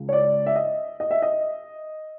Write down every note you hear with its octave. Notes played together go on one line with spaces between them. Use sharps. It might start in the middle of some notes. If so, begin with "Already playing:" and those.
Already playing: C#2 C#3
C#5
D5
E5
D#5
D#5
E5
D#5